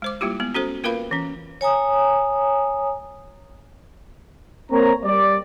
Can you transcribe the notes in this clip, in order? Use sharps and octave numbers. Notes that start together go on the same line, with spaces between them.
G#3 C5 D6
G3 A#3 E4 F4 G4
G#3 B3
C#4 F#4 A4 C5
A#3 F4 A#4 B4 F5 B5
E3 C#4
C#5 G#5 A#5 D#6
A#3 C4 C#5 A#5
G3 D5